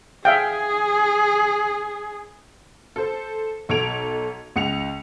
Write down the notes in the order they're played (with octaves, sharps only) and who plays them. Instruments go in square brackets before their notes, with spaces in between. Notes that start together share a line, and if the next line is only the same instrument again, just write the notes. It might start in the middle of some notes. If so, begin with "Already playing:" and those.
[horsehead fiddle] G#4 [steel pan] E5 F5 G5
[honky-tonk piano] A4 C5
B1 A4 G#6 D7 F7
C#2 C#7 F7